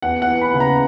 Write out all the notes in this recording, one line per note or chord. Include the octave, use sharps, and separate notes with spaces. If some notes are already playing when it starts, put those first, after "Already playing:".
E2 F#5
F#5
E3
B5
C#3
A#5